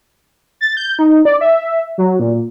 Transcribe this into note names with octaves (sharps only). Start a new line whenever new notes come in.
A6
G6
D#4
D5
E5
F#3
A#2